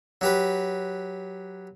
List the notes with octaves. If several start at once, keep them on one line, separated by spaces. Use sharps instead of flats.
F#3 G4 B4